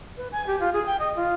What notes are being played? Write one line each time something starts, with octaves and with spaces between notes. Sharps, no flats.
B4
G#5
G4
F4
G#4
G5
D#5
F4